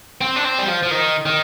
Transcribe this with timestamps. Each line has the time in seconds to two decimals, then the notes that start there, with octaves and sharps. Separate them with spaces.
0.21 C4
0.36 D4
0.45 C4
0.59 G3
0.68 F3
0.83 F3
0.91 D#3
1.26 D#3